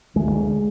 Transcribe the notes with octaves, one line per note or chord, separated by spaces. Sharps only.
D2 G#3
D3